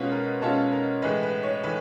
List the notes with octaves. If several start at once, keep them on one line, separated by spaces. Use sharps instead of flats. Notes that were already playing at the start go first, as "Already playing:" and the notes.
Already playing: B2 G#3 C#4 F4 B4
A#4
B2 G#3 C#4 F4 A4
A#4
A2 E3 G#3 B4
B4
C#5
A2 E3 B4